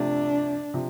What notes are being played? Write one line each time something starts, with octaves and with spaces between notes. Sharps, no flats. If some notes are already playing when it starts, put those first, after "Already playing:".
Already playing: C3 F3 A3 D4
C3 F3